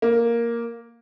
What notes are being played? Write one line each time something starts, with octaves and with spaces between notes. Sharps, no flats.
A#3